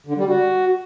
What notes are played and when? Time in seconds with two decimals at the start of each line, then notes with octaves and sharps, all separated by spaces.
0.06 D3
0.17 G3
0.28 F#4